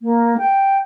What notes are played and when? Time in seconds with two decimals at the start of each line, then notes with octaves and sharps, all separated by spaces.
0.02 A#3
0.38 G5